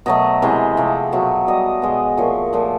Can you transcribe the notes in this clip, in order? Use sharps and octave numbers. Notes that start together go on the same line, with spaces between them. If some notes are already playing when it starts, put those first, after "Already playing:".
B2 F#3 A3 D#5
C3 E3 G#3
C3 F3 A3
B2 F#3 A3
B2 G3 D#5
B2 G#3
A#2 F3 A3 C#5
A#2 F3 A3